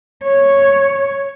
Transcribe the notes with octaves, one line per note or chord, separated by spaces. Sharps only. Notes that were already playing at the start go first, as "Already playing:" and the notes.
C#5